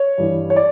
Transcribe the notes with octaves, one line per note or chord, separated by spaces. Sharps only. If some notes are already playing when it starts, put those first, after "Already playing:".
Already playing: C#5
G2 E3
C#5
D5